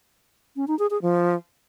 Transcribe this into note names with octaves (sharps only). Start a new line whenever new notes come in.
C#4
D#4
G#4
G#4
F3